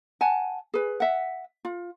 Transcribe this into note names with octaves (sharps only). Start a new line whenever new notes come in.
F#5 G#5 A5
G#4 B4
E5 F#5
F4